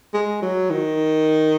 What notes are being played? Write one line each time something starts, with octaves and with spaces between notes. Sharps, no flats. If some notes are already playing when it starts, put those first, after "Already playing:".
G#3
F#3
D#3